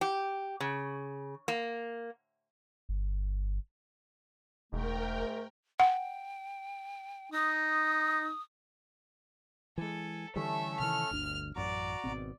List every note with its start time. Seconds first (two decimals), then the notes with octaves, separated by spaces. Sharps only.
0.01 G4
0.60 C#3
1.48 A#3
2.89 G1
4.73 E1 G#2 A3 A#4 G5
5.80 F#5 G5
7.32 D#4 D#6
9.78 E3 G#3 A4 G#5
10.36 D3 E3 G3 A3 C#4 A4 E5
10.80 C3 D#3 E3 F6
11.11 G1 D2 D4
11.56 A1 F#2 F#4 D5 A#5
12.04 G#1 B2 C4